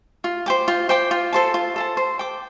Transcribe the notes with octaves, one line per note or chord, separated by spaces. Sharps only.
F4
C5 G5 D6
F4
C5 G5 D6
F4
A4 C5 A5
F4
A4 C5 A5
C5
G5 D6